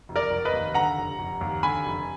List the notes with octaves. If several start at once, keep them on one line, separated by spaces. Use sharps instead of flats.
F1
A#4 D5
F1
B4 D#5
D#2
D3 F#5 A#5
F1
F1
D#2
D3 G#5 B5
F1